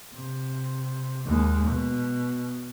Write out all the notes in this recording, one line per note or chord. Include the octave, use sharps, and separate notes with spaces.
C3
D#2 G#3
B2